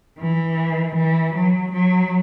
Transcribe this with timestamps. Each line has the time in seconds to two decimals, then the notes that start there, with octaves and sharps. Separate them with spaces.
0.19 E3
0.96 E3
1.34 F#3
1.73 F#3